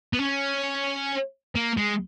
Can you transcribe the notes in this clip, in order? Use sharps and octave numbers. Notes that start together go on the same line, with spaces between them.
B3
C#4
A#3
G#3